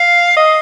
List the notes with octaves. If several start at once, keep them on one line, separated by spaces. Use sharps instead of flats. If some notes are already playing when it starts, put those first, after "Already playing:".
Already playing: F5
D#5